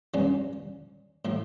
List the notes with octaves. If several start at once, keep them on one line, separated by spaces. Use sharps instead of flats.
G2 F3 C#4
A2 F3